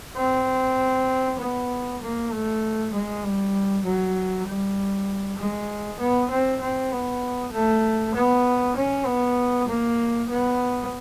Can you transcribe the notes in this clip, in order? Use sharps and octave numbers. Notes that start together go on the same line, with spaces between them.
C4
B3
A#3
A3
G#3
G3
F#3
G3
G#3
B3
C4
C4
B3
A3
B3
C#4
B3
A#3
B3